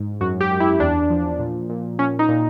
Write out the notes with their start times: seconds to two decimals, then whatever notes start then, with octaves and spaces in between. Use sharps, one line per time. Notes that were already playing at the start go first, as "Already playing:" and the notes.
Already playing: G#2
0.21 F#2 F#4
0.41 G4
0.51 F#2
0.60 E4
0.80 E2 D4
1.10 F3
1.39 A#2
1.70 A#2
1.99 A#2 C#4
2.19 D#4
2.29 A#2